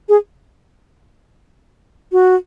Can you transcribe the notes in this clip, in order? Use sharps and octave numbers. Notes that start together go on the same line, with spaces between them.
G#4
F#4